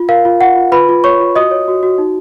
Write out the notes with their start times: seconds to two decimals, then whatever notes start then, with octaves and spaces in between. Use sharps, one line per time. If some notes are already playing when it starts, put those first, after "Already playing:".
Already playing: F4
0.09 A#4 F5
0.25 F4
0.41 F4 F#5
0.56 F4
0.72 F4 B4 B5
0.89 F4
1.04 C#5 C#6
1.20 F4
1.36 F#4 D#5 D#6
1.51 C#5
1.68 F#4
1.83 F#4
1.98 D#4